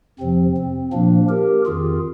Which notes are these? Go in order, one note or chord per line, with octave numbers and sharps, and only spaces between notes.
F2 C3 F3 C4
C4
A#2 F3 A#3 D4
G4 A#4
F2 D#3 F4 G#4